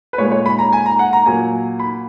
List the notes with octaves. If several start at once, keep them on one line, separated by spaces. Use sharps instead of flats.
B4
A#2 G#3 C#5
C#5
B5
A#5
G#5
A#5
F#5
A#5
A#2 F#3 G#5
B5